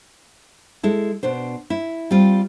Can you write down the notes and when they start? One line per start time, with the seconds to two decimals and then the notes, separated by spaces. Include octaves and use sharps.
0.83 G#3 E4 A4
1.23 B2 D4 C5
1.70 E4
2.11 G3 C4 F4